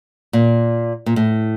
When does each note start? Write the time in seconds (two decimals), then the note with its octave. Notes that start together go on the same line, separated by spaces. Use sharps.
0.33 A#2
1.06 A#2
1.16 A2